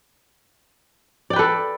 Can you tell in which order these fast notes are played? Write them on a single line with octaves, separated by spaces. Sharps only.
D5 G5 B4 A4